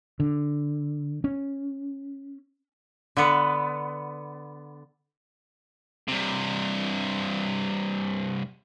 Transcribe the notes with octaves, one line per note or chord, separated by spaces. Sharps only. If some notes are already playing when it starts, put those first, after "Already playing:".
D3
C#4
D3 B3
G2 C3